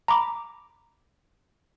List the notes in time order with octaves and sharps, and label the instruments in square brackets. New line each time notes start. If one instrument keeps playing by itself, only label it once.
[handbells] A#5 B5 D6